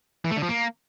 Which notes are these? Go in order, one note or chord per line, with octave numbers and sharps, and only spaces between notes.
E3
A3
D3
F3
A#3